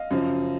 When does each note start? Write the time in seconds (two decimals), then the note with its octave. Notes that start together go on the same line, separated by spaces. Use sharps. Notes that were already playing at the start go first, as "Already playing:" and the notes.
Already playing: D#5 F5
0.11 F#2 C#3 F3